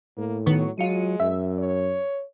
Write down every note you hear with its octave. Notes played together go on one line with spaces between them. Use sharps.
A2 A#3
D#3 F#3 B3 C#6
F#3 G#3 F4 C#7 D#7
F#2 E5
C#5